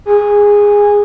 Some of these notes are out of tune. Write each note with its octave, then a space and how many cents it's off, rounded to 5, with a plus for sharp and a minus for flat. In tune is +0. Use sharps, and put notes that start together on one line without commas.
G#4 -15